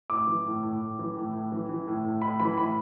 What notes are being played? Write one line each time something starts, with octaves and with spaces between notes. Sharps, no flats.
A2 D6
E3
A2
A2
A2
E3
A2
A2
E3
E3
A2
A2
A2 B5
E3 B5
A2 B5